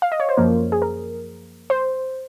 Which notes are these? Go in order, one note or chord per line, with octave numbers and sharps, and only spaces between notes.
F5
D#5
C#5
C5
F#2 F3 A#3 A#4
G#4
A#4
C5